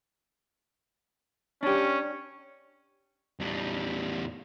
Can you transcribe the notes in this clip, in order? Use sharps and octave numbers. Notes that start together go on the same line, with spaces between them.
C#4 D4 G4
E2 G3